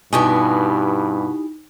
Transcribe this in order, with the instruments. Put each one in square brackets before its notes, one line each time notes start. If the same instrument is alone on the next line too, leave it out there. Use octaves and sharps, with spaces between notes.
[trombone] G2 [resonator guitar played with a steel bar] B2 B3 [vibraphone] D#4 [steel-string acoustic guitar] E4 G4 G#5